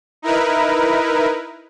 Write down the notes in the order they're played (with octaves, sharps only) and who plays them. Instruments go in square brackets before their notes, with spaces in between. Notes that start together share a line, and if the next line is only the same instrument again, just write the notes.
[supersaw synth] D#4 E4 A#4 B4